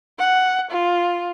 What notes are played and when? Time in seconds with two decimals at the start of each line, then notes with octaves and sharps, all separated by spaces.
0.19 F#5
0.71 F4